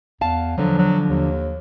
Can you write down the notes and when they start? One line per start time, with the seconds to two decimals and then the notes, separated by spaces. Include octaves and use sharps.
0.21 E2 F5 A5
0.58 D3 F3 F#3
0.79 F#3
1.08 D#2